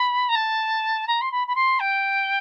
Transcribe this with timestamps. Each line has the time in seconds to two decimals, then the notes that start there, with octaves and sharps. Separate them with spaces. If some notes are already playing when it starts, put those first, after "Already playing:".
Already playing: B5
0.28 A#5
0.35 A5
1.07 A#5
1.21 C6
1.31 B5
1.47 B5
1.55 C6
1.79 G5